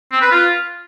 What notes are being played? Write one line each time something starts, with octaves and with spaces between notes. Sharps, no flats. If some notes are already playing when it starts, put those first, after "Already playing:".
C4
B4
F4